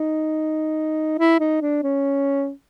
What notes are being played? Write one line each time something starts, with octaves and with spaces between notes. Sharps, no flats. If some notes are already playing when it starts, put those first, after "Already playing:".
Already playing: D#4
E4
D#4
D4
C#4